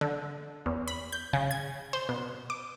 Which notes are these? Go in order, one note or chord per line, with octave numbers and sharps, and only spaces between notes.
D3
E2
B5
G6
C#3
G#6
C5
B2
D6